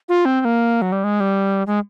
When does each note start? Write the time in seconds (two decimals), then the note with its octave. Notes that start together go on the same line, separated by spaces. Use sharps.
0.09 F4
0.25 C4
0.41 C4
0.45 A#3
0.82 F#3
0.92 G3
1.04 G#3
1.20 G3
1.67 G#3